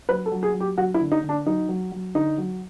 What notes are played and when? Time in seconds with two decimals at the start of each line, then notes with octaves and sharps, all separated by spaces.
0.09 F#3 B4
0.26 A4
0.32 F#3
0.43 G#4
0.54 F#3
0.60 G4
0.77 F#3 F#4
0.94 E4
1.00 D3
1.12 D#4
1.23 D3
1.29 D4
1.46 F#3 D#4
1.69 F#3
1.92 F#3
2.15 D3 D#4
2.38 F#3